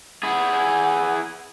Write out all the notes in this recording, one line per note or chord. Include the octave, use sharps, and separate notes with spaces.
E4 G#4 F#5